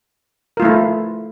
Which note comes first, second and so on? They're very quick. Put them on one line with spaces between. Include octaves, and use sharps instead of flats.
A#4 F4 A3 E4